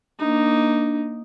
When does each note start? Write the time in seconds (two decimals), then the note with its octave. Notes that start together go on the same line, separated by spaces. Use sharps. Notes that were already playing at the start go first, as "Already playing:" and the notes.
0.19 A#3 D4 D#4